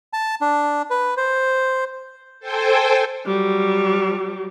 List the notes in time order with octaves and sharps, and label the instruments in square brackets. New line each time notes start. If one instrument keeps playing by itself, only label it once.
[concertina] A5
D4
B4
C5
[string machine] A4 C5 G5 G#5
[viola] F#3 G3